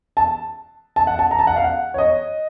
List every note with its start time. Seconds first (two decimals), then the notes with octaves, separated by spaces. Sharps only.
0.17 A5
0.96 A5
1.07 F#5
1.19 A5
1.31 A#5
1.39 A5
1.47 F#5
1.56 F5
1.64 F#5
1.94 C#5
1.98 D#5